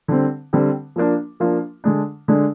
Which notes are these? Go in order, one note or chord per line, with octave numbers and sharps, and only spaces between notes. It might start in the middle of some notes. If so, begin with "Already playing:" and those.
D3 G3 C4
D3 G3 C4
F3 A#3 D4 F4
F3 A#3 D4 F4
D3 G#3 D4
D3 G#3 D4